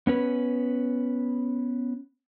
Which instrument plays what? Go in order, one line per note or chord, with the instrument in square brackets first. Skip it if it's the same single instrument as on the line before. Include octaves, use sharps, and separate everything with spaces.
[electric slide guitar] B3 C#4 B4